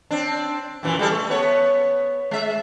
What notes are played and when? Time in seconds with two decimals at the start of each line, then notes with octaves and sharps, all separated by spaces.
0.11 C4 D4
0.83 F#2 A#2 E3
0.99 G3 G#3 A4
1.12 A3
1.30 B3 C#5
2.31 G#3 E5